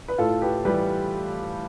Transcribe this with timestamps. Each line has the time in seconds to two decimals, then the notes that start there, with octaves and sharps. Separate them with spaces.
0.08 B4
0.18 A2 F4 A4
0.42 G4 B4
0.65 E3 G3 G4 B4